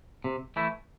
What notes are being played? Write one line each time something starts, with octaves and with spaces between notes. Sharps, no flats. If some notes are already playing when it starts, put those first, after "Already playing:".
C3
E3 A3 E4